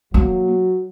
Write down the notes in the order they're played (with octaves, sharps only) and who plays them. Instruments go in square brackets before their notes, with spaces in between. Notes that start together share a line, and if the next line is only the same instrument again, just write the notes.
[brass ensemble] F#3 [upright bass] A#3